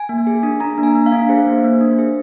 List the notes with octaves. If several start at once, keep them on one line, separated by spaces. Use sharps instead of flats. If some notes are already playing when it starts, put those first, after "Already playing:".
Already playing: G#5
A#3
G#4
D4
D4 A#5
A#3
G#5
A#3
F5
D4
G#4 C5
A#3
A#3
D4
G#4